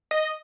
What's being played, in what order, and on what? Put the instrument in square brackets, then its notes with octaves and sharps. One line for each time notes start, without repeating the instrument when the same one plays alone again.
[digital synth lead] D#5